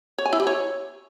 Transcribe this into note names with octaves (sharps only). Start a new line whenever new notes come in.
C#5
G#5
E4
G4
C#5